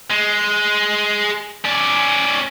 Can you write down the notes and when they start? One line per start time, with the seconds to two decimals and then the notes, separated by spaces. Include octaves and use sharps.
0.10 G#3
1.64 C#4 D5